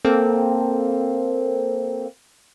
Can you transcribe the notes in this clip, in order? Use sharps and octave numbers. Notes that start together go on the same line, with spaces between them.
A#3 C4 A4